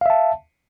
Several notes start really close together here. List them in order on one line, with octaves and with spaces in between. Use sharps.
F5 E5 A5